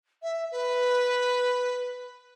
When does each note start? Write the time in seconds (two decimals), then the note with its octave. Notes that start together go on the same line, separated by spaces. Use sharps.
0.22 E5
0.52 B4